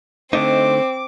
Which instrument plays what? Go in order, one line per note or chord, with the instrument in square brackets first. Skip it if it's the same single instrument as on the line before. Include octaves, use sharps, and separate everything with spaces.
[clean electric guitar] D3 A3 D#4 [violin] C4 [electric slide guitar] C5 D#5 [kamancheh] D6